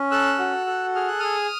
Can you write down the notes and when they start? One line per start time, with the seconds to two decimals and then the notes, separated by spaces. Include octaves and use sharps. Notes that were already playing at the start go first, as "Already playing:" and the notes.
Already playing: C#4
0.11 A4 E6 F#6
0.39 F#4
0.67 A4
0.95 G#4 F6
1.08 F#6
1.19 G#4 D#6 F6